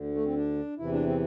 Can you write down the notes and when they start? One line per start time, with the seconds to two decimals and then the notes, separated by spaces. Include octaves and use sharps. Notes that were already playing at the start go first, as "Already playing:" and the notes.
Already playing: D2 D3
0.15 A3
0.25 C4
0.36 D4
0.78 E2 C3 E3 E4
0.92 D4
1.07 C4